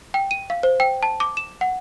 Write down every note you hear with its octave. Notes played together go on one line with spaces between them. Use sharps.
G5
D#7
F5
C5
G5
A5
D6
E7
F#5